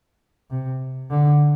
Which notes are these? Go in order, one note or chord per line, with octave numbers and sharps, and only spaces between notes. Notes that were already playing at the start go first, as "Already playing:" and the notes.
C3
D3